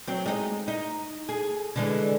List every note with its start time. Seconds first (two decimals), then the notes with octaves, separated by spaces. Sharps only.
0.07 F#3 C4
0.26 G#3 D#4
0.68 D#4
1.29 G#4
1.76 D3 E3 G#3